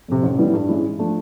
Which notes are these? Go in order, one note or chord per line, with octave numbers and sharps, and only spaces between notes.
F2 C3
A1
A2 E3 G3 B3
G2
E3 G#3 C#4
G#2
F3 A3 D4